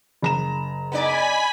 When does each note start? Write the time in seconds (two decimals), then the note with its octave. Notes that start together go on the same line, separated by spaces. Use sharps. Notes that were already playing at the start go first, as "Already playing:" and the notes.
0.22 F#1 A#5 E7
0.92 B3 D#4 D5 G#5 B5 B6